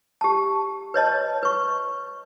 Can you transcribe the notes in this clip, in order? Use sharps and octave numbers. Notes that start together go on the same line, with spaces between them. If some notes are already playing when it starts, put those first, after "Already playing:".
G4 A5
B4 C#5 D#5 A5
B4 C#6